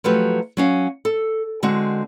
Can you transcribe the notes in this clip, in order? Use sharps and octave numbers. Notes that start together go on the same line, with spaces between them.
F3 F#3 A3 G4 B4
F#3 C#4 F5
A4
D3 G#3 C4 F#4